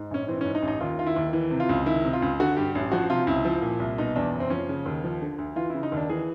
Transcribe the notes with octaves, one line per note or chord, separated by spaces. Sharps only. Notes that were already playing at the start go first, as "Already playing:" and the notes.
Already playing: G#2
A#1 C#4
E3 C4
G#2 C#4
D#4
A1
D#4
D#2 F4
D#3 F4
E4
D#2
E3
C3
F4
C#2
D#3 E4
C3
F4
C#2
D3 F#4
G2 G4
A1
F3 F#4
C3 F4
C#2 E4
F3
A#2
C2
B2 D#4
E2 D4
F#1
C4
F3 C#4
C#3
D#2
F3
D3
D2
E3 F4
E4
C#3
D#4
D#2 D4
E3 G#4